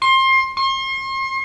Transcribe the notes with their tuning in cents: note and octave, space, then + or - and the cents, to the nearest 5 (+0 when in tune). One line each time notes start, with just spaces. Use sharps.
C6 +25
C6 +40